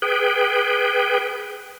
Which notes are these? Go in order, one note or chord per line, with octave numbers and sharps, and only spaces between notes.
G#4 B4 G5